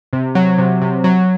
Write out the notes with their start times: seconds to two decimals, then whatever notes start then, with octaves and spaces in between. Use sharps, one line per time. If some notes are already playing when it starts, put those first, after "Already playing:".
0.13 C3
0.35 F#3
0.58 C3
0.82 C3
1.04 F#3